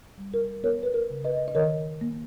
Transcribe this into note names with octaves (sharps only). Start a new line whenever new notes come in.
G3
A#4
B3 A#4 C#5
B4
A#4
C#3
B4 D#5
D#5
D#3 A#4 C#5
A#3